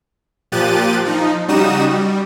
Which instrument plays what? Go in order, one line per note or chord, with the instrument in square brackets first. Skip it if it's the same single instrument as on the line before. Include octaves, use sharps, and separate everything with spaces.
[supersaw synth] A#2 F3 G4 F#6 A6 D#7
F3 D#4
C#3 G3 D#4 F#4 D#6 E7
G3